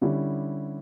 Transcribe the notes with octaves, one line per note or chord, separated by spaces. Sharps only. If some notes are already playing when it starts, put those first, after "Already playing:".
D3 G3 C#4 E4